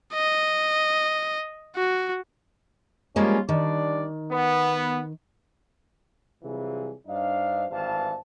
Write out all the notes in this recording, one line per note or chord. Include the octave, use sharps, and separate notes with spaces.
D#5
F#4
F3 G3 G#3 A#3 C#4 F4
D#3 G3 D4 D5
B3
C3 E3 F#3 G3 F4 G#4
G2 D4 D#4 C5 D#5 F5
G#1 G2 E3 C5 F5 A5